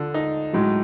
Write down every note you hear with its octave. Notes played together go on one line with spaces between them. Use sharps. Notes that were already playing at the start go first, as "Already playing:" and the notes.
Already playing: D3 F3
D#4
A2 F#3 G#3